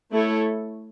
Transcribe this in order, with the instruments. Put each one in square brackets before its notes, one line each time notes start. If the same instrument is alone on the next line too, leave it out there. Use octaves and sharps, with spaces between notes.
[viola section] A3 E4 A4 C#5